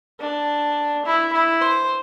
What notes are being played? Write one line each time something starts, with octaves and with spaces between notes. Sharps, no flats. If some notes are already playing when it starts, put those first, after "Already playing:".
D4
E4
E4
C5